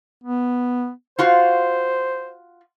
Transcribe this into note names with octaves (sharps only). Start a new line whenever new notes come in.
B3
F4 F#4 C5 F5